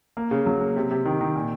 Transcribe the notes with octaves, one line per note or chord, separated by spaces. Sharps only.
A#3
C#3
F#3
A#3
C3
C3
D#3
D#3
A#2